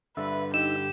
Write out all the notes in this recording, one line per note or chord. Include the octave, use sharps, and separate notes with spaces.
G2 D3 B4 E5
D#4 G4 E6 E7